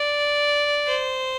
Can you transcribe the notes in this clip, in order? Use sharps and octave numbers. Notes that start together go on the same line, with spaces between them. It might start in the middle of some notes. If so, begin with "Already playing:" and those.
Already playing: D5
C5